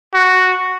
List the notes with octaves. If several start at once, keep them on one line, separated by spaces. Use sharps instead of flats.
F#4